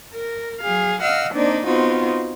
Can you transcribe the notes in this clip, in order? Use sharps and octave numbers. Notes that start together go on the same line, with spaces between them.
A#4
F#3 G#4 F5
D#5 F5 F#5 E6 F6
A#3 C4 D4 D#4 D5
B3 C4 D#4 F4 F#4